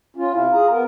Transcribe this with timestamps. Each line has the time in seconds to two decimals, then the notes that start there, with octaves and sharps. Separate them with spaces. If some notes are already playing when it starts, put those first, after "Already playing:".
0.17 C#4 F4
0.33 C3 E4 F4
0.53 G#4 A#5
0.71 B3 A#4